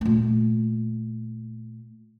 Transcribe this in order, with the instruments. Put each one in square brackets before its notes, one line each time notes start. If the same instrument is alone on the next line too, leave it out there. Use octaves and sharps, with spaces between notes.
[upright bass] A#2 A3